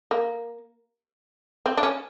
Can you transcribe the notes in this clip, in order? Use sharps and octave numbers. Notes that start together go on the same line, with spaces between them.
A#3
C4
D4
C#4